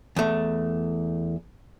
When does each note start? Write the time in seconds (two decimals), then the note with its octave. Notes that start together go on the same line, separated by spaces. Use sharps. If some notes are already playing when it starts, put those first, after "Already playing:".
0.16 E2 A3